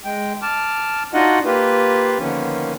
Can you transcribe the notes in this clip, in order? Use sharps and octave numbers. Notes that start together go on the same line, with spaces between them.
G#3 G5
A5 D6 F6
D4 D#4 F4 F#4 D#5 F#5
A#3 F4 G4 B4
D3 D#3 F3 A#3 B3 C#4